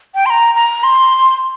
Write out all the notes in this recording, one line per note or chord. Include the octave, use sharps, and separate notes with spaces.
G5
C6
A#5
A#5
C6